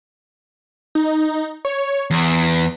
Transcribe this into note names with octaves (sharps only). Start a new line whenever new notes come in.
D#4
C#5
E2 C7 D7